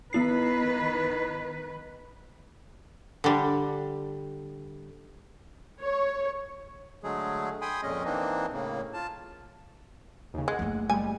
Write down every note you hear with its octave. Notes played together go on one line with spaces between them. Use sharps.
D#3 B3 E4 B4 C7
D3 G3
C#5
D3 F#3 G#3 A3 G#4
G5 G#5 B5 C6 D#6
F2 A#2 G#3 C#4 D#5
E3 A#3 C4 D4 D#4
A2 C#3 A#3
F4 A5
D#2 C#3
G#3 F#5
F#1 A3
G3 G#3 G#5